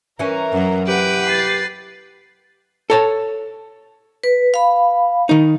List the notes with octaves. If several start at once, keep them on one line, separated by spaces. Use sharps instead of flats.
E3 C#4 A#4 A#5
F#2
G4 B4 F#5 D7
A6 C7
A4 C#5 A5
B4
F5 B5
D#3 D#4